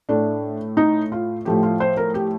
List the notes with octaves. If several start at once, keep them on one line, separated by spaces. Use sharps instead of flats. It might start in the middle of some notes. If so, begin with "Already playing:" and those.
A2 A3 D4
D#4
F4
A2 F3 A3 G4
F4
C5
A#4
G4